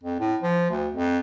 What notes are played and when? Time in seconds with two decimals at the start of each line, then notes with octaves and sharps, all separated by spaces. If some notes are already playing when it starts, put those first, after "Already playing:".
0.03 F2
0.20 A2
0.42 F3
0.70 D2
0.93 F2